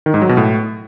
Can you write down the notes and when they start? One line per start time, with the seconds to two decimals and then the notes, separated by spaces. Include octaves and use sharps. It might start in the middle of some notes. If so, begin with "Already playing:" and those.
0.06 D#3
0.14 G#2
0.22 F#3
0.29 B2
0.37 A2